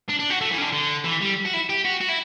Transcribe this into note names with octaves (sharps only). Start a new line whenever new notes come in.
D4
D4
F#4
A3
E3
C#3
D3
D3
E3
G3
F#4
E4
G4
F#4
F#4
E4